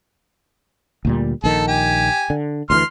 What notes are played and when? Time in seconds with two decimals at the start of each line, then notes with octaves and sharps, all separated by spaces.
1.05 D2 A#2 G3
1.44 A#1 D#3 A4
1.68 G4 G#5
2.30 D3
2.70 D2 D3 E3 C6 F6